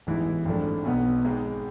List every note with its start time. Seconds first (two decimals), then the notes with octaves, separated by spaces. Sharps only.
0.07 A1 G#2 E3 B3 E4
0.45 G#1 G#2 F3 A3 D4
0.85 B1 B2 B3
1.24 G#1 G#2 G#3